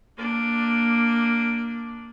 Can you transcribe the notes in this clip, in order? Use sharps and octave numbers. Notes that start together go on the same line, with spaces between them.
A#3 D4